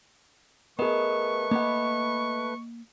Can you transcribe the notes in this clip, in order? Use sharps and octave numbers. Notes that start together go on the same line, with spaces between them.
A3 B3 G#4 A#4 B4 D#5 C#6
A#3 D#5 F#5 B5